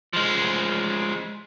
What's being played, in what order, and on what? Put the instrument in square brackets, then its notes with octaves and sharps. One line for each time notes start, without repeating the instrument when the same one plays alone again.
[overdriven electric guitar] F3 G#3